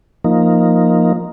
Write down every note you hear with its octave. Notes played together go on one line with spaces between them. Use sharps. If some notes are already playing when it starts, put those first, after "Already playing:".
F3 A#3 D#4